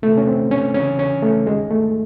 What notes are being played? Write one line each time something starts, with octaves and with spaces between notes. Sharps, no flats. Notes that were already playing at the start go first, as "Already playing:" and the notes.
E2 C3 D#3 A3
C#4
C4
C#4
E2 C#3 E3 C#4
C#4
A3
D#2 D#3 G#3
A3